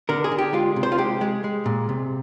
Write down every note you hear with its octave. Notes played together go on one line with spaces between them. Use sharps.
D3 A#4
G#4
D3
G4
G#3 F4
C3
C5
F4
G#3 G4
G#3
G#3
A#2
C3